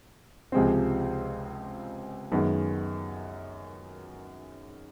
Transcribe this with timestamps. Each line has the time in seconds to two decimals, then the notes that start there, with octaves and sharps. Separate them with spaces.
0.52 C#2 C3 F3 G#3 C4
2.32 F#2 D#3 G#3 B3